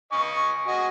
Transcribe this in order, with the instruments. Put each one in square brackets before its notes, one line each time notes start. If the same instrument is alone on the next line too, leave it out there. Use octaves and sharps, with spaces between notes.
[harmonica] D#5 G#5 C#6
F#4 D#5 G#5